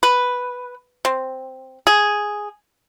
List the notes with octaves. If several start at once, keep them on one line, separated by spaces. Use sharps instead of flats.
B4
C4
G#4